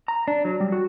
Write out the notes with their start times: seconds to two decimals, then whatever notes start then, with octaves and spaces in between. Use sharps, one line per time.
0.08 A#5
0.28 D4
0.45 F#3
0.60 G3
0.72 F#4